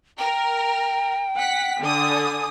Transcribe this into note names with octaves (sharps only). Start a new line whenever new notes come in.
A#4 G5
F#5 B6
D3 G#5 D#6